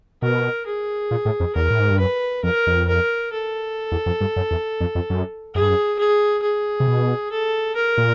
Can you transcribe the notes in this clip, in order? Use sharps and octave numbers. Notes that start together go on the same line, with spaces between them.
B2 A#4
G#4
A#2
A2
F2
E2 A#4
A2
G#2
G2
F#2 B4
F2 A#4
F2
A#4
A4
E2
F2
G2
F#2
E2
F2
F2
F#2
F#2 G#4
G2
F#2
G#4
G#4
C3
B2
A4
A#4
A#2